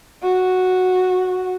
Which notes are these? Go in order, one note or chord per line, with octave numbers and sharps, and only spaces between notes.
F#4